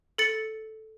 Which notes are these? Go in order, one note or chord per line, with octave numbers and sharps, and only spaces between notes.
A4 A6 C#7